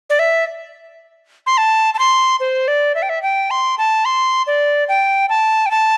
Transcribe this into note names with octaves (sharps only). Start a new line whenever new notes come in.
D5
E5
C6
A5
A5
C6
C5
D5
E5
G5
E5
G5
C6
A5
C6
D5
G5
A5
G5
A5